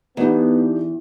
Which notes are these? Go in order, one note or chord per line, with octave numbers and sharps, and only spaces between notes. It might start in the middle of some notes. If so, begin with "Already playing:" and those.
E2 B3 D4 D#4 G4